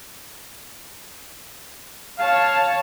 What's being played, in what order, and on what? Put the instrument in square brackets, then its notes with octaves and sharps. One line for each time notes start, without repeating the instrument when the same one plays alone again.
[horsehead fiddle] C#5 A5 [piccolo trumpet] F5